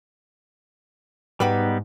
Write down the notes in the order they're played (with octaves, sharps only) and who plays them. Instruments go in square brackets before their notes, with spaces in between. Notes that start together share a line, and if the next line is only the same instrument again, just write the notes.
[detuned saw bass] G#2 [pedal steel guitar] G3 B3 D#4 [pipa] F#4 G4 B4